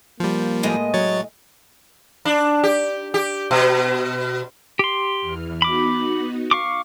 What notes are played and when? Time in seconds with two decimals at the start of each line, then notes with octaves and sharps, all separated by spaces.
0.20 F3 G3 A#3
0.63 A2 G#3 D#5
0.94 F#3 C#5 A6
2.25 D4
2.64 G4
3.14 G4
3.51 B2
4.79 G4 C6
5.21 E2 E3 F6
5.62 B3 D#4 F#4 B5 D6
6.51 F5 C#6 D6